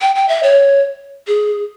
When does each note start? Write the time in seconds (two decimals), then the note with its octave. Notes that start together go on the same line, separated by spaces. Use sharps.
0.01 G5
0.15 G5
0.28 E5
0.43 C#5
1.27 G#4